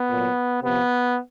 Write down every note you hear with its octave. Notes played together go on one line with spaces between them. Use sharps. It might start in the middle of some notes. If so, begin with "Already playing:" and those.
Already playing: B3
A#2 F#3
C3 F3 B3